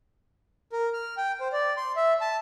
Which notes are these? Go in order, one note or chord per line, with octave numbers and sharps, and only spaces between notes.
A#4
F6
G5
C5
D5
C6
E5
A5